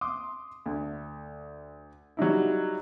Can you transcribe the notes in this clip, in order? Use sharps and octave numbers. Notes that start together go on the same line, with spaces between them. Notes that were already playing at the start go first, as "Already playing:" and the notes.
C6 D6 D#6
D2
F#3 G3 D#4 E4